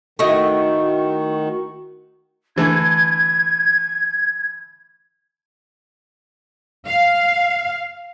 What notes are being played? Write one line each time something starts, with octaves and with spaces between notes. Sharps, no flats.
D#3 A3 E4 F#4 D#5 C#6
D3 E3 A3 G#6
F5